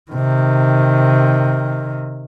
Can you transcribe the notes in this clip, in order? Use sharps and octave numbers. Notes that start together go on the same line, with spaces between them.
C3 D#3